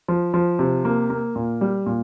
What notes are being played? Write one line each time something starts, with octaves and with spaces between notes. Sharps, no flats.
F3
F3
C3
A#3
A#3
A#2
G3
A#2